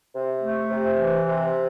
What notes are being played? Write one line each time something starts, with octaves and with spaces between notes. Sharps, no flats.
C3
A3
C3
E3
C3